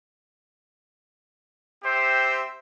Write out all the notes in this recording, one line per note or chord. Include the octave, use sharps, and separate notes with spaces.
C4 G4 C5 E5